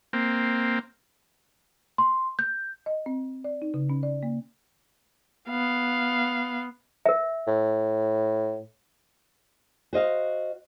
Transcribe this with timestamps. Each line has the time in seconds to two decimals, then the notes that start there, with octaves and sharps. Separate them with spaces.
0.13 A#3 C4
1.98 C6
2.39 G6
2.86 D#5
3.06 C4
3.44 D5
3.62 D#4
3.74 C#3
3.89 C#4
4.03 D5
4.23 A#3
5.50 B3 F5
7.06 A#4 E5
7.47 A2
9.93 F#4 C5 D#5 F5